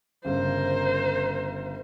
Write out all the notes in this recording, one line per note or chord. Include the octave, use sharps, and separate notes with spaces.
G1 C#3 A#4 C5